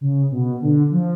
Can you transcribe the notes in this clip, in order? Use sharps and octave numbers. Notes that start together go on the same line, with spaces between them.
C#3
B2
D3
F3